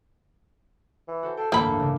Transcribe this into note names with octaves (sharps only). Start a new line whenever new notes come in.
E3
F#4 A4 C5
A4 G5 C7
A1 D2 G2 A#3 A4 B5
C#3 D4